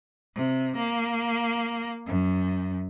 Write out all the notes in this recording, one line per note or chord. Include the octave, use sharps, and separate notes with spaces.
C3
A#3
F#2